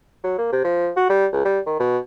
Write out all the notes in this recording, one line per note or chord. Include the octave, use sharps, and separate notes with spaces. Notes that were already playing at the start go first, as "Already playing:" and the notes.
F#3
A#3
C3
F3
F#4
G3
C#2
G3
D#3
B2